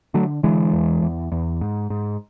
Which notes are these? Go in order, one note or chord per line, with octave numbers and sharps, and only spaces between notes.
D3 F#3 A3
D3 E3 G#3
E2
E2
E2
G#2
G#2